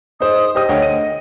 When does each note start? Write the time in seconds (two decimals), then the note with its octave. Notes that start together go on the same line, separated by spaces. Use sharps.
0.20 D#4 G#4 C5 D#6
0.55 G4 C5 D#5 D#6
0.69 D2 C#5 G5
0.82 D#7